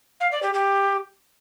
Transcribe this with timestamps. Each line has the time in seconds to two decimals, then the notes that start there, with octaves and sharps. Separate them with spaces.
0.20 F5
0.31 D5
0.42 G4
0.53 G4